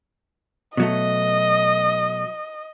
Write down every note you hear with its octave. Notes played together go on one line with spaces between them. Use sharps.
B2 F#3 A3 D#5